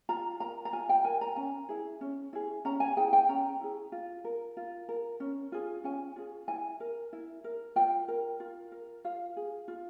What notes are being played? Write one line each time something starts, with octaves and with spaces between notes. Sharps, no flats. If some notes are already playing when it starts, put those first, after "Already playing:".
F4 A#5
A#4 A#5
A#5
F4 G#5
G5
A#4 G#5
A#5
C#4 G#5
E4 G#4
C#4
E4 G#4
C#4 A#5
G#5
E4 G#4 G5
G5
C#4 A#5
E4 G#4
F4
A#4
F4
A#4
C#4
F4 G#4
C#4 G#5
F4 G#4
E4 G#5
A#4
E4
A#4
F4 G5
A#4
F4
A#4
F4 F5
G#4
F4